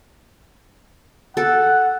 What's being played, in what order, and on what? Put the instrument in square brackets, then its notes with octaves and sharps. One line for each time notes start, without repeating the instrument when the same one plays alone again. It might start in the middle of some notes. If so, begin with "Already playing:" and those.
[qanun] A4 [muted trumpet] F#5